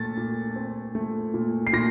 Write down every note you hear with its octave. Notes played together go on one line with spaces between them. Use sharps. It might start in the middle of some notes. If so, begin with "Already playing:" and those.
Already playing: A#2 A3 A6
A#2
C4
A3
A#2
C7
A#2 A#6